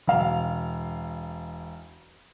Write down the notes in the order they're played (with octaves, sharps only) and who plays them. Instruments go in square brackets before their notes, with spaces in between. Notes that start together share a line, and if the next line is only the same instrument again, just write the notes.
[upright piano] E1 F5 F7